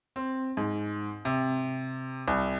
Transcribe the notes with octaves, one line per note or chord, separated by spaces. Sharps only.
C4
G#2
C3
C2